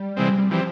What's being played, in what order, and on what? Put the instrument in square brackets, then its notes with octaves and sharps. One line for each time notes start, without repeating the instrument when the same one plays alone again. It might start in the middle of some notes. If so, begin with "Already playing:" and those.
Already playing: [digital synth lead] G3
[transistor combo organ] C3 E3 G#3 C4
[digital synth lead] G3
[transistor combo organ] E3 G3 C4 [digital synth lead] F3